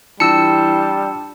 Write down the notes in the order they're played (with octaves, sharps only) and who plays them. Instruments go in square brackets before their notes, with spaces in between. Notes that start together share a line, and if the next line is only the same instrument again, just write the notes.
[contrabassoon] E3 [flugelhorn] G3 [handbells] D4 F4 A5 [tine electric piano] E6 C#7